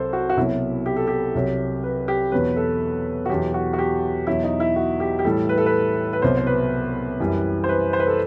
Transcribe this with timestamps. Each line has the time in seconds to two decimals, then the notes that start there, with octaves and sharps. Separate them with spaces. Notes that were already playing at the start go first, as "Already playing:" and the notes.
Already playing: C2 C3 F#3 A4 C5
0.13 F#4
0.29 F#4
0.37 C2 B2 F#3 E4
0.86 G4
0.96 A4
1.07 G4
1.35 C2 C3 F#3
1.84 B4
2.08 G4
2.32 E2 B2 F#3 B4
2.56 A4
3.26 F#4
3.29 E2 B2 F#3 G4
3.54 F#4
3.73 F#4
3.79 G4
4.27 E2 B2 F#3 E4
4.44 D#4
4.60 E4
4.76 F#4
5.00 G4
5.19 G4
5.25 A2 E3 G3 A4
5.49 B4
5.58 A4
5.66 B4
6.13 B4
6.22 C2 B2 F#3 C5
6.37 C5
6.47 B4
7.20 F#2 E3 G3
7.64 C5
7.69 B4
7.93 C5
8.00 B4
8.07 A4